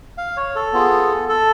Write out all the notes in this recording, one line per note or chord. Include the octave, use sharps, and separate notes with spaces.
F5
C#5
A4
B3 F4 G#4
A4